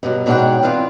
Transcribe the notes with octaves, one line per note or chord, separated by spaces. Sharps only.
G2 B2 F#3
G#2 B2 D4 C#5 F#5 G5
E3 B3 C4 D4 F4